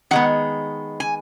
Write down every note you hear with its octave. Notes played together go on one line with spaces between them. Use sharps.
D#3 G#3 B3 F#5
G#5